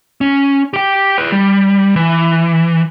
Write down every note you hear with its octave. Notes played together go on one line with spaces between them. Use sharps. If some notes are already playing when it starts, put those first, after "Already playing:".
C#4
G4 G5
G#4 B4
G3
E3